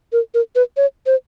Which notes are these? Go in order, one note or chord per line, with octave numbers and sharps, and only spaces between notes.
A#4
A#4
B4
C#5
C5